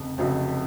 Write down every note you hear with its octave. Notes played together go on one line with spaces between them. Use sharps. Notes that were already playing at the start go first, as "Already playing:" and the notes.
Already playing: F1 F2 C#3
F1 F2 C#3 F#3